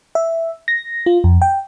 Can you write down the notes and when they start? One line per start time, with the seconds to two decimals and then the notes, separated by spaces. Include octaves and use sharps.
0.15 E5
0.68 A#6
1.06 F4
1.24 F2
1.42 G5